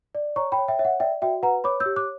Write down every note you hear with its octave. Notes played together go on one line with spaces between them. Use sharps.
D5
C#5 A#5 C#6
G5 B5
C#5
E5 G5
C#5 E5
F#5
D5 E5 G5
F#4 E5 G5
B4 F#5 A#5
C#5 B5 D6
E6 G6
G4
D6 F#6